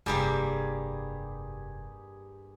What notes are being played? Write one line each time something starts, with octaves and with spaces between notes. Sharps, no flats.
F1 G2 G3 A#3 G4 G#4